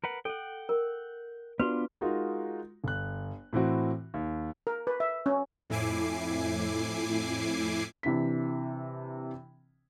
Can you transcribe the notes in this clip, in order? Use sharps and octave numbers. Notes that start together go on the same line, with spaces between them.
A#4 B4 F#5
A4 F#5 G5
A#4
B3 D4 F4 F#4 B4
G#3 D#4 F4 F#4 A#4
G1 F#6
A2 E3 C4 F#4
D#2
A#4
B4
E5
C#4
F2 A2 E4 G#5 D6 C7
C3 E3 D4 B6